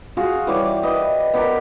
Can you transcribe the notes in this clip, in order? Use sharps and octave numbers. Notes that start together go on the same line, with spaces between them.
F4 F#4 G#4
E3 G3 C#5 D6
B4 D#5
B3 G4 A#4